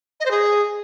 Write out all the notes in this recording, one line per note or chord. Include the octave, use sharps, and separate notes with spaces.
D#5
C5
G#4